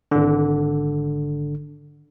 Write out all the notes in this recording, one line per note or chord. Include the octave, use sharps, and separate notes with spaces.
G#1 D3